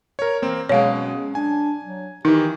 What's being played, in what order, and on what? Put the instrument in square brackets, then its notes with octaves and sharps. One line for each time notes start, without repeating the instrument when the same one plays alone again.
[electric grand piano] A#4 C#5
[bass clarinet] E3 [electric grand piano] A#3 C4
[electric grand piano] B2 F#3 G#3 [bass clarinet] C#4 [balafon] C#5 F5
[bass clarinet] D4 [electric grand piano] G#5
[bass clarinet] F#3
[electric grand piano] D#3 E3 [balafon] D#4 [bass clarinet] G4